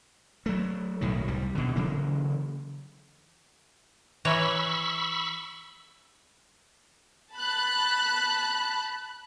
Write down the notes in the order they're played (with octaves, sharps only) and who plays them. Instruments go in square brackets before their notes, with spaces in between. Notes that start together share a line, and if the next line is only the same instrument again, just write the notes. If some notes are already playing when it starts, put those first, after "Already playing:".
[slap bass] F#3 A3
B1 A2 D#3 F#3
C2 G3
B2 D3
C#3 E3 F#3 A#3
[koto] E3 A#4 C#5 [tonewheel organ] B5 C#6 E6
[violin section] A5 B5 F#6